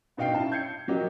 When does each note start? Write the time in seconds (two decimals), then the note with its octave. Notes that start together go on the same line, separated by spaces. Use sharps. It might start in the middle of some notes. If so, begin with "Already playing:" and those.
0.17 G2 B2 D#4 F5 G5 C7
0.35 F#2 C#4 E4 A5
0.52 G6 G#6 C7 C#7
0.88 F3 F#3 A#3 G4 D#5